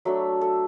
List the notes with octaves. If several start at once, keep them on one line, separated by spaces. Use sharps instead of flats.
F#3 A3 D4 E5
A4